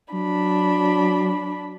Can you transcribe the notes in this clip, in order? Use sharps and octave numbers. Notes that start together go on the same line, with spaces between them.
F#3 D4 B5